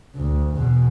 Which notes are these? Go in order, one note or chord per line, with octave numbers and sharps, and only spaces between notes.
D2
E2 B2